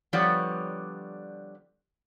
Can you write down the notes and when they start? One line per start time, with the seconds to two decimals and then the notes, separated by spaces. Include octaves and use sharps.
0.13 D3 F3 G3 B3 C#5 D5